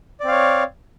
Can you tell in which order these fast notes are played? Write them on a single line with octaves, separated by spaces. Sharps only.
D5 C4 F5 C#5